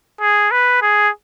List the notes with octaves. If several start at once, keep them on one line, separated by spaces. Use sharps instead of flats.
G#4
B4
G#4